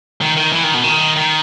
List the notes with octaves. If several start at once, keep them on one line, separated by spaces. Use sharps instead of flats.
D#3
D#3
E3
D#3
B2
D#3
D#3